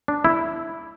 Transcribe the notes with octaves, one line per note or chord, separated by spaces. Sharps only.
D4
E4